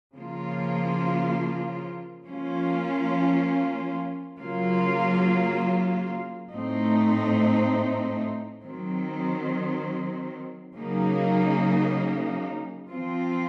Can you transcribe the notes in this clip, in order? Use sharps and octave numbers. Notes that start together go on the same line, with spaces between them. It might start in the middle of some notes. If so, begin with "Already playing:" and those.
C#3 F3 A#3 F4
F3 A#3 C#4 F4
C#3 F#3 A#3 F4
A2 A3 C4 D#4
D#3 F#3 C4
C#3 F#3 A#3 D#4
F3 C4 F4